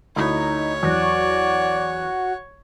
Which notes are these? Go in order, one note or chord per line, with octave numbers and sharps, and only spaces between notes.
D2 D#4 E4 C#5 B5
E2 F#3 F#4 D5